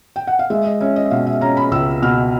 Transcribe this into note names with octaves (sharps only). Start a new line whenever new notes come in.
G5
F#5
F5
G#3 E5
D#5
C#4 E5
D#5
E5
B2 F5
E5
C#4 A#5
B5
C#2 E6
B2 F6